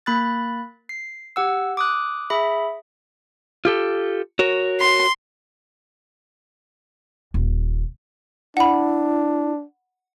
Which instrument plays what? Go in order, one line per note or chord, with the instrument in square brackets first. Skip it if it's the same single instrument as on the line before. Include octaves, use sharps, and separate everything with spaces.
[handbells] A#3 B5 F#6 A6
C7
G4 F#5 E6
D6 D#6 F#6
G#4 E5 B5
[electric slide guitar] F4 G4 A4
F#4 A#4 C#5
[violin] C6
[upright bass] D#1
[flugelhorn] D4 [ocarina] E4 [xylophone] F#5 B5